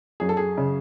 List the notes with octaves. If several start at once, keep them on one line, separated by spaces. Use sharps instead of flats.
F#2 G#4
A4
G#4
C#3